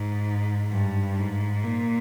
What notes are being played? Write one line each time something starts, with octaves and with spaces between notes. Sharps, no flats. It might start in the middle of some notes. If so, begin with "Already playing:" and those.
Already playing: G#2
G2
G#2
A#2